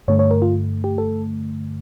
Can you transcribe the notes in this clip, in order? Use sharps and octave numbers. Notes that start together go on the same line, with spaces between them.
G2 D3 A3 C#5
C#5
A#4
F4
G4
A4